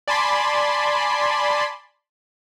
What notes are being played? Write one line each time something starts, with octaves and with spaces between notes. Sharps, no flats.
D5 G#5 A5 B5 C6